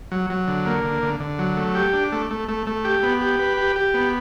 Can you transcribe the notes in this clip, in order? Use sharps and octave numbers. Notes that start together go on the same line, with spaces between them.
F#3
F#3
D3
A#3
D3
D3
D3
F#3
A3
G4
D4
A3
A3
A3
A3
G4
B3
G4
B4
G4
G4
B3